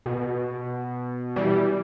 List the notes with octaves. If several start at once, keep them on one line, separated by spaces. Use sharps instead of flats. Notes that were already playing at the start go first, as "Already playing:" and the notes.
B2
E3 G3